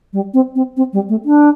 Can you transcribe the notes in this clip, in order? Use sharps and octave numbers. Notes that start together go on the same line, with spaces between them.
G3
C4
C4
C4
G3
A3
D4